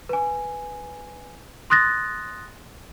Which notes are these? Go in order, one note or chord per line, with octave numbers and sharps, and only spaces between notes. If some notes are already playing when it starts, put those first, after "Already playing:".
B4 G#5
C6 D#6 F#6 A6 A#6